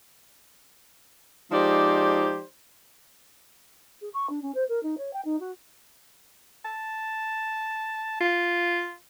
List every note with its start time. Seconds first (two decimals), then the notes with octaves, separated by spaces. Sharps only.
1.52 F3 G#3 D#4 G4 C5 D5
4.02 G#4
4.14 C#6
4.30 D4
4.42 C#4
4.55 C5
4.69 A#4
4.83 D#4
4.98 C#5
5.13 G5
5.25 D#4
5.40 F#4
6.65 A5
8.20 F4